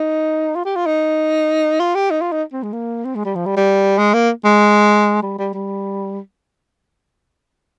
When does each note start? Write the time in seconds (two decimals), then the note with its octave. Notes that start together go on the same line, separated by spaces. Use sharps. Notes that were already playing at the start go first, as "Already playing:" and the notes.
Already playing: D#4
0.55 F4
0.65 G4
0.76 F4
0.86 D#4
1.80 F4
1.95 G4
2.11 D#4
2.22 F4
2.32 D#4
2.53 C4
2.63 G#3
2.73 A#3
3.05 C4
3.15 G#3
3.25 G3
3.35 F3
3.46 G3
3.57 G3
3.98 G#3
4.14 A#3
4.45 G#3
5.23 G3
5.38 G3
5.54 G3